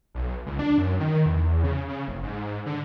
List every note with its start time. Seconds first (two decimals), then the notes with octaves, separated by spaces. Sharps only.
0.15 B1
0.46 C#2
0.59 D4
0.78 F#2
1.00 D#3
1.26 E2
1.64 C#3
1.88 C#3
2.08 F#1
2.23 G#2
2.66 D3